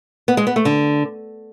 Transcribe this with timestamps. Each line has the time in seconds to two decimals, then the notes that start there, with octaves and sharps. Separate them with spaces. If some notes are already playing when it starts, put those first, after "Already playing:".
0.28 B3
0.37 G#3
0.47 B3
0.56 A3
0.65 D3